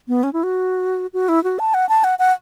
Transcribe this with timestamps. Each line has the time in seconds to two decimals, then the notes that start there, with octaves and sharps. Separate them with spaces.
0.08 B3
0.23 C#4
0.33 E4
0.43 F#4
1.13 F#4
1.29 E4
1.44 F#4
1.59 A5
1.74 F#5
1.89 A5
2.04 F#5
2.19 F#5